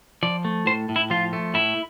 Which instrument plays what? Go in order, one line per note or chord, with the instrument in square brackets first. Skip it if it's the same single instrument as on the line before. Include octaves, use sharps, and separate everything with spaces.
[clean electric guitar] F3 D5
A3
A2 C5
A2
E4
F3 F4
A3
A2 E4